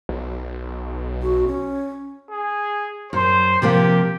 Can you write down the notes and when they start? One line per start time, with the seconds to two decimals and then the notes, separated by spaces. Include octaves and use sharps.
0.09 B1
1.22 F#4
1.47 C#4
2.31 G#4
3.13 F#2 C5
3.62 C3 F3 A#3 G4